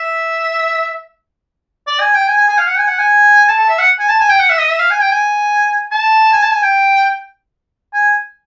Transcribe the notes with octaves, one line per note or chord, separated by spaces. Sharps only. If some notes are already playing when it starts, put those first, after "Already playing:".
Already playing: E5
D5
G#5
G5
G#5
G#5
G#5
F5
F#5
G#5
F#5
G#5
A5
A5
E5
F#5
G#5
A5
G#5
G5
F#5
E5
D#5
E5
F5
G#5
G5
G#5
A5
G#5
A5
G#5
G5
G#5